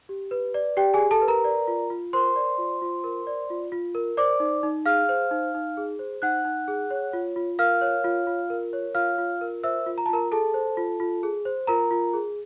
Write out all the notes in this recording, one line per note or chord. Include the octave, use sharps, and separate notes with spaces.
G4
B4
D5
G4 G5
G#4 G#5
G4
A4 A5
B4
A#4 A#5
D5
F4
F4
A#4 C5 C6
D5
F4
F4
A#4
D5
F4
F4
A#4
C5 D5 D6
D#4
D#4
G#4 F5 F6
C5
D#4
D#4
G#4
C5
D#4 F#5 F#6
D#4
G#4
C#5
F4
F4
A#4 F5 F6
C#5
F4
F4
A#4
C#5
F4 F5 F6
F4
A#4
C5 E5 E6
F4
A#5
A5
F4 A#4 A#5
G#4 A4 A5
C5
F4
F4
G#4
C5
F4 A#4 A#5
F4
G#4